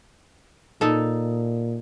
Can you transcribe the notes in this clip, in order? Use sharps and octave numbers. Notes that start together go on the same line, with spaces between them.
A#2 D#4 A4